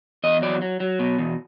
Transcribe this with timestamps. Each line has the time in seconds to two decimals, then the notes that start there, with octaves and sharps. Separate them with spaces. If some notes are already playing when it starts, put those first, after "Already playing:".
0.24 E2 D#5
0.42 F#3 D5
0.62 F#3
0.80 F#3
0.99 B2
1.18 E2